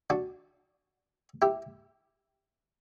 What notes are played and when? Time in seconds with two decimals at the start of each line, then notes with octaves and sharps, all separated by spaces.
0.10 D4 F#4
1.42 E4 G4